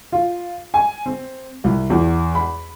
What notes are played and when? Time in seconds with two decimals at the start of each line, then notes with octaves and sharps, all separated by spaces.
0.12 F4
0.74 G#5
1.06 C4
1.64 C2
1.90 E2
2.35 B5